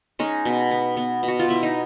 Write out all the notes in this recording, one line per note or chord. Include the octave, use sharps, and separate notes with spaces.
G#3 C#4 D#4
B2
B3
B3
B2
F#4
F4
B2 E4
D#4